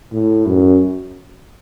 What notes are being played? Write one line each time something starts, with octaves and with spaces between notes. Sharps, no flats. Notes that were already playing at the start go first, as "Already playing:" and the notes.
A2
F#2